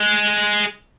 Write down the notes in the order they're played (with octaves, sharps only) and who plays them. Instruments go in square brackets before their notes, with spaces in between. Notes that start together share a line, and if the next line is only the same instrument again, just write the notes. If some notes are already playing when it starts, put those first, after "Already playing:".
Already playing: [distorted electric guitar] G#3